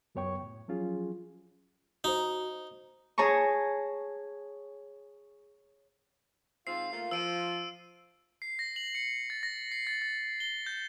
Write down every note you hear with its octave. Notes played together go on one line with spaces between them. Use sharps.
C#2 F#2 B3 C#5 G5 C#6
A2
F3 F#3 C#4 F4 G#4
D#4 F#4 C5
G#4 C#5 A5 A#5 C#6
G#2 C4 F4 C7
A3 A#3 F4
F3 E6 D7 D#7
C7
A#6
F#7
C#7
A6
A#6
C7
A6
A6
G7
G6